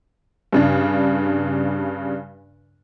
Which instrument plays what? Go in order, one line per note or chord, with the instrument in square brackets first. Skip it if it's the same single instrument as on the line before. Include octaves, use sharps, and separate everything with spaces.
[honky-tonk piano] G2 C#3 D4